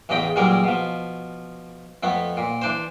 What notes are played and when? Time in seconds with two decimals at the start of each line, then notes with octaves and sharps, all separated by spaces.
0.09 A1 E2 C#3 D#5 G5 B5
0.36 A#2 E3 F#3 G3 G#4 A#4
0.64 B2 F3
2.03 F2 A3 B3
2.37 A#2
2.62 E3 D4 C5